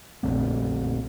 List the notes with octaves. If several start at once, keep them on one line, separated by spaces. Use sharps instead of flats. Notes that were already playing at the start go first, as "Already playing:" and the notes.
A#1 A3 C4 D4